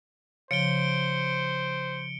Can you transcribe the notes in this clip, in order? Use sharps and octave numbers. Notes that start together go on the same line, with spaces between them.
C#3 F3 C5 C#7 D7 G7